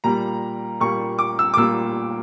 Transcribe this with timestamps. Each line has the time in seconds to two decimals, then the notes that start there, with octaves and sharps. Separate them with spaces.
0.04 A#2 G3 A#3 A#5
0.80 A#2 G3 A#3 C#6
1.19 D6
1.39 E6
1.54 D6
1.57 A#2 G3 A#3 E6